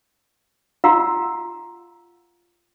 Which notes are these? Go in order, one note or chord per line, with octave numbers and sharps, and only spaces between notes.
F4 F5 F#5 A#5 C6 E6